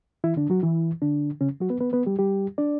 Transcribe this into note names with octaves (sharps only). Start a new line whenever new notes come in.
E3 E4
D3 D4
F#3 F#4
E3 E4
D3 D4
C#3 C#4
F#3 F#4
B3 B4
B3 B4
B3 B4
G3 G4
G3 G4
D4 D5